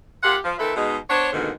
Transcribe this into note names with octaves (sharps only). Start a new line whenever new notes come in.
A#2 F4 G4 F#5
F3
A#2 D#3 A4 B4 E5
B2 G#3 D#4
B3 D4 C5 C#5
F2 G#2 B2 D3 D#3 A#3